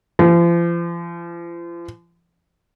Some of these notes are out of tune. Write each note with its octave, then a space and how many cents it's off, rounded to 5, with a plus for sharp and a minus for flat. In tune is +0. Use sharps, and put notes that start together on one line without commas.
F3 -40